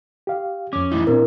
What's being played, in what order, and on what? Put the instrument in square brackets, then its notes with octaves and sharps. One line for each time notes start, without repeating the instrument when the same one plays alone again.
[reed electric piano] G4 F5
[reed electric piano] F2 D6 [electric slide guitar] C#4
[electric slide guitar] E3 A3 D#4 [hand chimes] E4
[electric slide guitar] A#2 [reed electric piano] C4 D4 [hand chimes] A#4